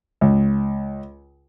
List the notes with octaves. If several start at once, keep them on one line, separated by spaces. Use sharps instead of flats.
C#2